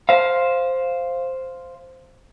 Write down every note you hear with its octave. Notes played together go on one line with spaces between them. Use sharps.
C5 F5